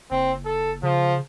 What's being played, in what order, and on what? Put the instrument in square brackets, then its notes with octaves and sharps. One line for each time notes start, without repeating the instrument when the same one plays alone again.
[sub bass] F#1 [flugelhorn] C4
[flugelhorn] A4
[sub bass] C#3 [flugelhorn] F3